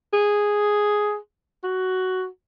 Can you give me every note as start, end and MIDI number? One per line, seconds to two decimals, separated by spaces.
0.13 1.17 68
1.64 2.26 66